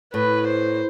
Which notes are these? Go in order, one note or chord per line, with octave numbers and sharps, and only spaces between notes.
A2 B4
C5